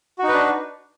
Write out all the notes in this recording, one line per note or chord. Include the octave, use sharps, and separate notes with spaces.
D4 D#4 F#4 B4